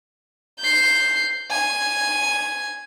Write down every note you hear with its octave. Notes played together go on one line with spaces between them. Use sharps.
G6 C7
G#5